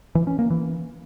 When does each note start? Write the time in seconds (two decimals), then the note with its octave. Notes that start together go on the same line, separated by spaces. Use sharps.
0.15 E3
0.27 C#4
0.39 A#3
0.50 E3